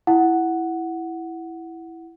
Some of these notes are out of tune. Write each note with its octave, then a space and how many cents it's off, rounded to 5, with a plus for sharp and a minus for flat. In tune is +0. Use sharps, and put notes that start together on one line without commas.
E4 +0 F#5 +0